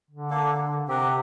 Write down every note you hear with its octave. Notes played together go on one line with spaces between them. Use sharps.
D3
A#3 D4 A4
C3 C4 G4 A#4 F#5